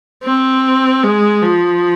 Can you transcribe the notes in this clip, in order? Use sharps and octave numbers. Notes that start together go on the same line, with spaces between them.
C4
G#3
F3